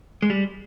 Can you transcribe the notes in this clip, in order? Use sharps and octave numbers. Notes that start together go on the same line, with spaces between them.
G#3
G3